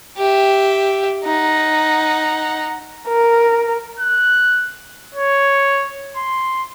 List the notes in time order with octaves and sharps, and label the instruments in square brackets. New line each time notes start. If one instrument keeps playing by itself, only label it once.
[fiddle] G4 E5
D#4 F#5
[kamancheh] A#4
[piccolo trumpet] F#6
C#5
C6